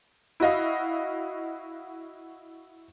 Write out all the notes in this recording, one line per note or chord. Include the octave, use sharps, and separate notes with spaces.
E4 F#4 D#5 F5